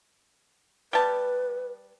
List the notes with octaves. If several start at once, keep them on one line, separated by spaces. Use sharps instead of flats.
G3 B4 A5